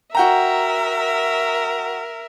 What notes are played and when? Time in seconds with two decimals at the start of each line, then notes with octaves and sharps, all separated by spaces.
0.15 F#4 A#4 E5 G5 A#5